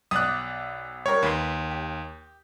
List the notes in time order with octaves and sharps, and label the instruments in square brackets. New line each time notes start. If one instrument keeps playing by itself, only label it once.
[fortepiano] B1 D5 D6 [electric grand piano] D#6 F#6
[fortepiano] G3 G4 A#4 [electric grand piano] C#5
[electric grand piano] D#2 [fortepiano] B4 C6
[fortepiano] G4